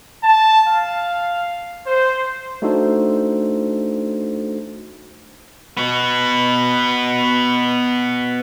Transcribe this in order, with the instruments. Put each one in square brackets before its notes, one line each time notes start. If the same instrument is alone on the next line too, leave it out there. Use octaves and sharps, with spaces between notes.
[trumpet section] A5
F5
C5
[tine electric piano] A3 D4 D#4 F#4 A4 C5
[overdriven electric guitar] B3 F#4